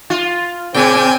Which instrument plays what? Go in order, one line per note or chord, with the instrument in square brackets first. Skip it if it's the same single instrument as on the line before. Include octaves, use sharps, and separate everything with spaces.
[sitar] F4
[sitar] A#2 C#3 [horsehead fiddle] C4 [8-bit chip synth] G5 G#5